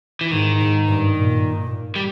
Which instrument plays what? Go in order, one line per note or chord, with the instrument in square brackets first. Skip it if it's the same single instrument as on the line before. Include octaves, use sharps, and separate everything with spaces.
[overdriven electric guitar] E3
[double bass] G#2 [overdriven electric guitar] D#3
[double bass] G#2
G2
A#2
[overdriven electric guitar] G3